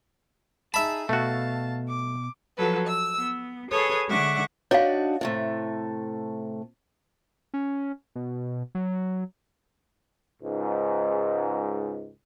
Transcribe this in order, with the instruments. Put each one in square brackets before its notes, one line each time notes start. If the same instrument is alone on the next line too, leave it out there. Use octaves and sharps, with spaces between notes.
[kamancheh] D#4 G#4 [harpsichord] E5 B5 [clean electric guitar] A5
[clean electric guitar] B2 [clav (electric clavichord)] A3 F#4 [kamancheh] F5 A5
[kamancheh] D6
[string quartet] F3 F#3 A4 B4
E6
B3
G#4 A4 B4 C#5 D#6
D3 G#3 E5 F#5 C#6 D6
[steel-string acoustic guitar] D4 D#4 F#4 [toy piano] C#5 F5
[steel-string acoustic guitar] A2 C3 A3
[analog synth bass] C#4
B2
F#3
[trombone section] C#2 G#2